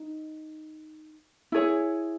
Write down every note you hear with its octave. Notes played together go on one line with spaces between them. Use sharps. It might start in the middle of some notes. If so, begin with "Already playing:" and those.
Already playing: D#4
E4 G#4 C#5